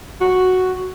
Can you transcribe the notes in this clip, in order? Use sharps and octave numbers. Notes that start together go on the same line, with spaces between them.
F#4